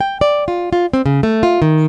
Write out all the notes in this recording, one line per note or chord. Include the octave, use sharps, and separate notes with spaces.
G5
D5
F4
F4
C4
C#3
A3
F4
D#3